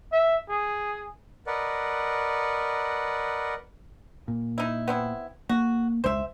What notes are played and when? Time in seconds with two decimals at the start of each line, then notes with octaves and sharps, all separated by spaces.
0.12 E5
0.49 G#4
1.47 A#4 B4 D5 D#5 F#5
4.28 A#2
4.58 D#4 E4
4.88 B3 C4 E4
5.49 A#3 F#4
6.04 E1 C#2 G#3 C5 E5